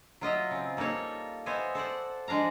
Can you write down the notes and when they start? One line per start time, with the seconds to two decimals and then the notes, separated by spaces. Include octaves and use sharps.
0.21 F#3 F4 D#5 E5
0.51 C#3 C4
0.77 G3 A#3 D#4 A4 C#5
1.46 B3 C5 C#5 D#5 E5 G#5
1.75 A4 C5 D5 F#5
2.28 F3 G#3 D4 F5 A#5